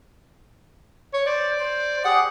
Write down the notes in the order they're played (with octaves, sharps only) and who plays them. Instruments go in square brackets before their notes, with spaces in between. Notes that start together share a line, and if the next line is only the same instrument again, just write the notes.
[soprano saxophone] C#5
[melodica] C5 [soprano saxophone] D5
[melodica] C5
[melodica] G4 G#4 [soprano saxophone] F#5